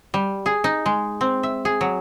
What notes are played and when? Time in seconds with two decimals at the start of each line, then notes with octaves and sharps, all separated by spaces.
0.14 G3
0.46 G#4
0.64 D#4
0.86 G#3
1.21 C4
1.43 E5
1.65 G#4
1.81 F#3